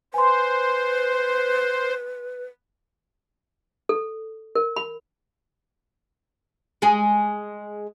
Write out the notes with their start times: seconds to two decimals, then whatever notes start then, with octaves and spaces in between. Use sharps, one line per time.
0.14 B4 C5 G#5 C6
3.89 A4
4.55 A#4
4.76 B5
6.82 G#3 G#4